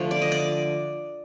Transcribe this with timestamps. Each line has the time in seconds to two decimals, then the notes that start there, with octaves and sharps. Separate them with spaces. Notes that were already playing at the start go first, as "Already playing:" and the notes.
Already playing: D3 F3 A3
0.11 D5
0.21 D#5
0.32 D5